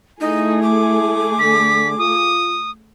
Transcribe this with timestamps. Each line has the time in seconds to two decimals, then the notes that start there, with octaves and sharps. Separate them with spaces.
0.21 A3 D#4 E4 G#4
0.63 D6
1.39 D3 B6
1.98 F4 D#6